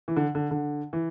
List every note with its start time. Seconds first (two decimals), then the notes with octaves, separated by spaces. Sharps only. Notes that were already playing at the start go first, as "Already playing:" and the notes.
0.08 E3
0.16 D3
0.35 D3
0.51 D3
0.93 E3